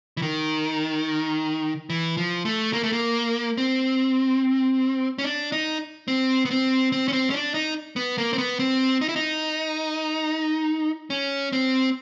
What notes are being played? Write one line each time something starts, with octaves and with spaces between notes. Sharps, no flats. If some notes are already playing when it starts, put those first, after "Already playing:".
E3
D#3
E3
F3
A3
A#3
A3
A#3
C4
C#4
D4
D#4
C4
B3
C4
C4
C#4
C4
C#4
D4
D#4
B3
A#3
C4
B3
C4
D#4
E4
D#4
C#4
C4